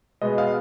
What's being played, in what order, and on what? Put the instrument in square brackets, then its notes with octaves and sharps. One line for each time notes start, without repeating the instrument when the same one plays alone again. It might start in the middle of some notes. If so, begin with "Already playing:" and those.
[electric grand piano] B2 G#3 B3 D#5
F5